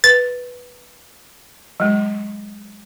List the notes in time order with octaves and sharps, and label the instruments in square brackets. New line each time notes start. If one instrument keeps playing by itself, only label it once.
[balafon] B4 [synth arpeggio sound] A6
[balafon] F#3 G#3